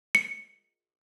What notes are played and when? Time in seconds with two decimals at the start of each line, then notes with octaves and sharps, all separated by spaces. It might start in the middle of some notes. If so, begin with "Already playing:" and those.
0.15 C#7